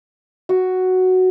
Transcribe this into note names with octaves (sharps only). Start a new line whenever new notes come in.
F#4